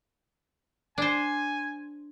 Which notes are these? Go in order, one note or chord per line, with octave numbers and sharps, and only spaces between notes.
D4 C5 G#5